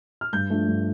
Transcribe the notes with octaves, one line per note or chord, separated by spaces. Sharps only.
F6
G2 G6
F3 A3 D4
G2